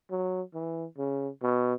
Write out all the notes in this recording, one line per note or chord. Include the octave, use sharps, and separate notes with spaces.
F#3
E3
C#3
B2